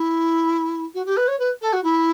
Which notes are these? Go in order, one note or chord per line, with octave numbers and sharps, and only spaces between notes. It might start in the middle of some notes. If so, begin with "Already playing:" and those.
Already playing: E4
F#4
G4
B4
C#5
B4
A4
F#4
E4